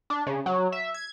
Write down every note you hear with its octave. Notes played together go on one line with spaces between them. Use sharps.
D4
C#3
F#3
E5
G#6